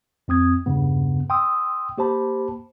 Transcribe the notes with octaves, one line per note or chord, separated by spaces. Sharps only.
F2 C4 D#6 G#6
E2 G2 C#3 B3
G5 C6 D#6 E6
A#3 G4 C5 A5 B5